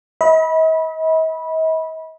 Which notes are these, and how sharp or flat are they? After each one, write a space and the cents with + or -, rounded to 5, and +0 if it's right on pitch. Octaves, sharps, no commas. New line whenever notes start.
D#5 +45 B5 -20